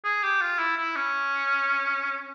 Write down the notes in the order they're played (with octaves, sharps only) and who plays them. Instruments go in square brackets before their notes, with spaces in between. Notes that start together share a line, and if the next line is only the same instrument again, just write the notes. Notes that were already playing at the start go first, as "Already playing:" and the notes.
[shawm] G#4
G4
F4
E4
E4
C#4